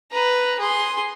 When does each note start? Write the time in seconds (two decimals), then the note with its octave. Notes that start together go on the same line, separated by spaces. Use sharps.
0.12 B4 A#5
0.59 G#4 C6